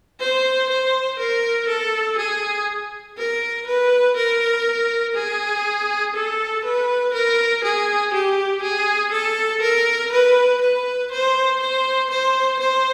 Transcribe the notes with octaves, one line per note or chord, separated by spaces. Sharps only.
C5
C5
A#4
A4
G#4
A#4
B4
A#4
G#4
A4
B4
A#4
G#4
G4
G#4
A4
A#4
B4
B4
C5
C5
C5
C5